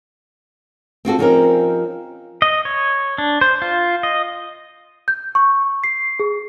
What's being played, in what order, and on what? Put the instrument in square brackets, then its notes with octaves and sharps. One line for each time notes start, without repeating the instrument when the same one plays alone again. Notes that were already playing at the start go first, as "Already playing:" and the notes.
[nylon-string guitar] C4 F4 F#4 A4
F3 C4 C#4 D#4 G4 A#4
[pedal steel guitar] D#5
C#5
D4
C5
F4
D#5
[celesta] G6
C#6
C7
G#4